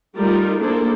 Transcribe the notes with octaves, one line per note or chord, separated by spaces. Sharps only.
G3 A3 D#4 F4 A#4
A#3 D4 E4 G#4 A4 C5